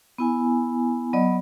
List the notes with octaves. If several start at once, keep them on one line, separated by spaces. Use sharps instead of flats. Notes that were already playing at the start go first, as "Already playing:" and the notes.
B3 E4 G#5
F#3 B3 D5 D#5